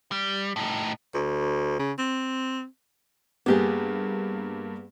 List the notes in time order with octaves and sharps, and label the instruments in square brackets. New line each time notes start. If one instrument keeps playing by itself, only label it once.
[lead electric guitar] G3
A2 D#4
[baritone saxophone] D2
C#3
C4
[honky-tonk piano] G2 A#3 [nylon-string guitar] B3 G4 G#4